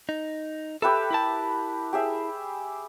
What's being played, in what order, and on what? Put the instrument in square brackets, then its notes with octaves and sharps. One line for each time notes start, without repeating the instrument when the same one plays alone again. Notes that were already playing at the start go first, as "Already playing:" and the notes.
[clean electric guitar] D#4
[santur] G4 B4 E5 [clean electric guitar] A4
[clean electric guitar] E4 A#4 A5
[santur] G4 G#4 E5